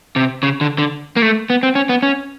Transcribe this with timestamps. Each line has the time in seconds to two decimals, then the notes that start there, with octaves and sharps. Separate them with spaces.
0.16 C3
0.43 C#3
0.61 D3
0.78 D3
1.16 A#3
1.22 A3
1.50 B3
1.63 C4
1.75 C#4
1.89 B3
2.02 C#4